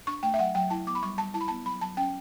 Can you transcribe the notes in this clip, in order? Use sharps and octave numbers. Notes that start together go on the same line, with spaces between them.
D4 C#6
A3 G5
E5
F#3 F#5
F#3 G5
E4 A5
B3 D6
B5
G3 C#6
G3 A5
E4 A5
B5
B3 A5
F#3 B5
F#3 A5
C#4 G5